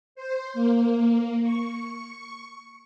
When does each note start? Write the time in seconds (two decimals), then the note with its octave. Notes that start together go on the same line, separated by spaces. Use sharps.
0.15 C5
0.54 A#3
1.43 C#6